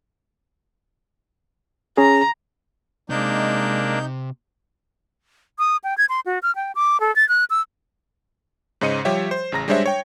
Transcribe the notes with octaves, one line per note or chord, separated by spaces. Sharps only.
C#4 G#4 A#5
C3 G#3 A#3 D4 D#4 G6
D#6
G5
G#6
C6
F#4
F6
G5
D6
A4
A6
F#6
E6
G#2 C#3 C5 D#5 C#7 D#7
F3 G3 G4 C#5 E5
C5
A1 C#3 A#5 A#6
G3 G#3 D4 C5 C#5 E5
C#5 G5